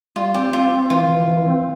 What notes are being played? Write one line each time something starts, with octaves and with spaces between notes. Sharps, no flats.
G3 F4
C4 G4
C4 F4
C4
E3 F4
E3
E3
C4